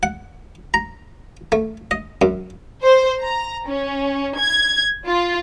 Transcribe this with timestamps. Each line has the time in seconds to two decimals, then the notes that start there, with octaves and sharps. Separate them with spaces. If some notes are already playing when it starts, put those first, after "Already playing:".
0.03 F#5
0.74 A#5
1.52 A3
1.91 D#5
2.22 F#2
2.83 C5
3.21 A#5
3.67 C#4
4.37 G#6
5.07 F4